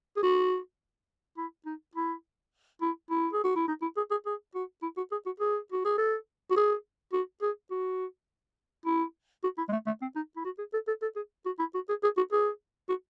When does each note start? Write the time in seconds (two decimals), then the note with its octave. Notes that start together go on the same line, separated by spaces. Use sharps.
0.16 G#4
0.23 F#4
1.37 E4
1.66 D#4
1.96 E4
2.81 E4
3.10 E4
3.33 G#4
3.44 F#4
3.56 E4
3.68 D#4
3.82 E4
3.97 G#4
4.11 G#4
4.26 G#4
4.55 F#4
4.82 E4
4.97 F#4
5.12 G#4
5.26 F#4
5.40 G#4
5.72 F#4
5.85 G#4
5.98 A4
6.51 F#4
6.56 G#4
7.13 F#4
7.42 G#4
7.71 F#4
8.86 E4
9.43 F#4
9.58 E4
9.68 G#3
9.72 A3
9.86 A3
10.02 C4
10.16 D#4
10.36 E4
10.45 F#4
10.58 G#4
10.73 A4
10.88 A4
11.02 A4
11.16 G#4
11.46 F#4
11.59 E4
11.74 F#4
11.89 G#4
12.03 G#4
12.17 F#4
12.32 G#4
12.89 F#4